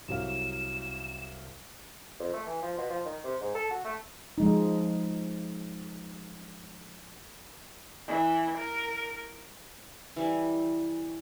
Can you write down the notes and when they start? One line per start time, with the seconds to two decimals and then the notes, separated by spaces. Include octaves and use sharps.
0.08 C2 F#3 F5 E7
2.20 F2
2.33 A3
2.46 E3
2.62 F3
2.78 B2
2.90 F3
3.05 D#3
3.24 C3
3.41 G#2
3.55 A4
3.70 F#4
3.85 A3
4.38 F3 G#3 D#4
8.07 E3
8.58 A#4
10.16 E3 G3 E4